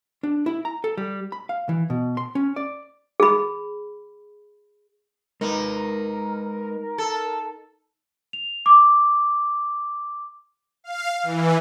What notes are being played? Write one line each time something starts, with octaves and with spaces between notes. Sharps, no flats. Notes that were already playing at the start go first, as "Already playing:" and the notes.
D4
E4
A#5
A4
G3
B5
F5
E3
B2
C6
C#4
D5
G#4 B5
G#3 D#4 A#4 B4
A4
F7
D6
F5
E3